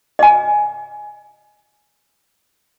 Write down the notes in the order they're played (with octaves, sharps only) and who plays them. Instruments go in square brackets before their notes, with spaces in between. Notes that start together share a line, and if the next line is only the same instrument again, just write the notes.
[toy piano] D#5 G#5